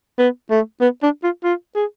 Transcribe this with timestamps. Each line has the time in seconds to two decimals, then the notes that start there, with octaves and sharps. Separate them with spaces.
0.18 B3
0.50 A3
0.81 B3
1.03 D4
1.24 F4
1.44 F4
1.75 G#4